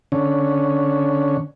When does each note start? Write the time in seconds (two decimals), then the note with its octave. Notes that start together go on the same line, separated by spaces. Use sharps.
0.12 D3 C#4